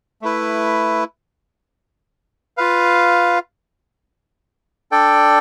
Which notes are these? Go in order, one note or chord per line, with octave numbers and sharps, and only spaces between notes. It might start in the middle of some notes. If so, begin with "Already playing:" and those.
A3 E4 B4
F4 B4 F5
D4 A4 D5 G5